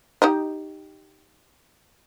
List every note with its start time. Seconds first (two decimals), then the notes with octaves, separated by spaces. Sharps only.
0.22 D#4 G4 D#5